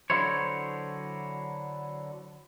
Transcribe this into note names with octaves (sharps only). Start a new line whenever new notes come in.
D3 F#3 E4 C5 C#5